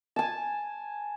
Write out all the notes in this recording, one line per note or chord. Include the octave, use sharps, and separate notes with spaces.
G#5 A5